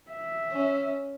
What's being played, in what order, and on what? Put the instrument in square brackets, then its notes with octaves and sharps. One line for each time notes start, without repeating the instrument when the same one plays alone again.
[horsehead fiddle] E5
[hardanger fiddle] C#4